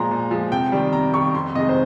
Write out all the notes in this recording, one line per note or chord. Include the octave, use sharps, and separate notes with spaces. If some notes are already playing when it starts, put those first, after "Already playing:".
Already playing: A#2 F3 G#3 A#5 C6
A#2
F3 G#3
C3 G5
D#3 G3
C3 A#5
D#3 G3 C#6
F2 C6
C3 D#3 G#3 D#5
C5